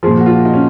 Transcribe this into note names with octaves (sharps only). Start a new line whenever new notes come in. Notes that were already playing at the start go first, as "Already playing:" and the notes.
A#2 F3 G#4
F#4
F4
F#4
D#4
C#4